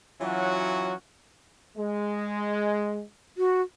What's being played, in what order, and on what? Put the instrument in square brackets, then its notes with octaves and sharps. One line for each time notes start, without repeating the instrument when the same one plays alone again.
[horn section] E3 F#3 C#4 F4 F#4
[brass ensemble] G#3
[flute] F#4